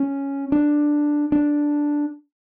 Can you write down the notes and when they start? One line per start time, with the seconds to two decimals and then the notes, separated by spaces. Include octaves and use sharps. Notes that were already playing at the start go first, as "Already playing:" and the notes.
Already playing: C#4
0.52 D4
1.32 D4